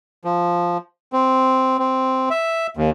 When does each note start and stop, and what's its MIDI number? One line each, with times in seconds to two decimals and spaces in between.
0.25 0.77 53
1.13 1.77 60
1.79 2.29 60
2.30 2.67 76
2.77 2.90 39